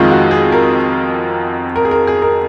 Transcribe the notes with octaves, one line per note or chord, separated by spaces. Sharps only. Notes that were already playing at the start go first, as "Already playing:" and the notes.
Already playing: F2 D#3 G#3 F4
F#4
G#4
A#4
A#4
G#4
A#4
G#4
A#4